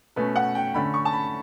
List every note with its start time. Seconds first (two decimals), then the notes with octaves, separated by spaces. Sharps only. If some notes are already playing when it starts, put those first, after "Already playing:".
0.16 B2 A3 C#4 B4
0.36 F#5
0.55 G5
0.74 D3 A3 C#4 B5
0.94 C#6
1.05 A5
1.13 B5